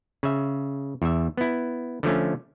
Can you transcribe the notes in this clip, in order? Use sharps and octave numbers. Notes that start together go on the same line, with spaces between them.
C#3 E5
E2 E5
B3 E4
D3 F3 A3 C#4